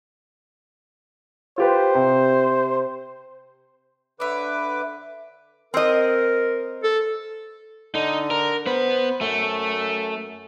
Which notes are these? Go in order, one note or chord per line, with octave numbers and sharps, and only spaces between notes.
F4 G4 B4 C5
C3
D3 B4 C#5 E5 D6
C4 A#4 D#5
A4
D3 D#4
A#4
B3 B4 C5
F#2 A3